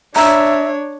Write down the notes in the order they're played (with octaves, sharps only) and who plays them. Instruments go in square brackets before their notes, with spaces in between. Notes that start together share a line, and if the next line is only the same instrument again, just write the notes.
[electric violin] D4 C#5 [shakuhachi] E5 [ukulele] A#5